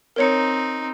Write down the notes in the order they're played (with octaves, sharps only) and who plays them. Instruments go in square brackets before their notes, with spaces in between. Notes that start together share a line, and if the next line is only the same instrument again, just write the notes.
[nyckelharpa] C4 D#4 [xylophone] A#4 C#5 C#7